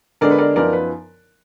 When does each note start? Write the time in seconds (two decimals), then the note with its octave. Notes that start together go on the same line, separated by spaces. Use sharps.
0.21 D3 G#3 B3 D4 A#4 D5
0.31 B4
0.38 A#4 D5
0.56 F#2 F3 B3 D#4 A#4 D5
0.73 B4